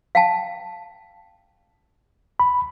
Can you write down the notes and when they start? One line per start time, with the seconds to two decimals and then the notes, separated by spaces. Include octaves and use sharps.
0.15 F5 G5 A5
2.40 B5